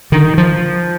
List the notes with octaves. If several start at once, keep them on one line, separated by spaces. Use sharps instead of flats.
D3 D#3
F3